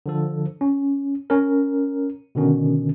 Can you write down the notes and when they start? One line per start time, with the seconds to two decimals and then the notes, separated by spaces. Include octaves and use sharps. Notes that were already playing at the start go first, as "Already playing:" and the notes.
0.06 D3 F3 A4
0.61 C#4
1.30 C#4 A#4
2.35 B2 D3 D#3 C#4